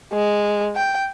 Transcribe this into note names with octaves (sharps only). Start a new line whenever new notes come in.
G#3
G5